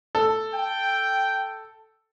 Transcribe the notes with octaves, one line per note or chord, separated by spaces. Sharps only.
A4
G5